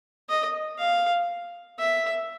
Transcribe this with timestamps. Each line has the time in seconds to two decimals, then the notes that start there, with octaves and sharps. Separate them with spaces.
0.29 D#5
0.79 F5
1.79 E5